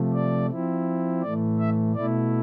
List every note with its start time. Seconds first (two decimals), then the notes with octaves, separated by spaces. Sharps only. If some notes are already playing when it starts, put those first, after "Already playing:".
Already playing: C3 F3 A3
0.14 D5
0.50 F3 C4 E4
1.23 A2 E3 A3 D5
1.59 E5
1.95 B2 A3 E4 D5